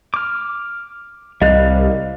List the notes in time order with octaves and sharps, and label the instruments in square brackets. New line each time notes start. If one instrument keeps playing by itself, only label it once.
[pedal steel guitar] D6 F6
[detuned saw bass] C2 [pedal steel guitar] G3 F5 F#6 [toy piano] D#5